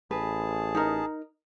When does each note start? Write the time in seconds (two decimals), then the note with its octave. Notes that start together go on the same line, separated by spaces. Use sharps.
0.11 A1 G#4 B4 A5
0.75 D#4 A#4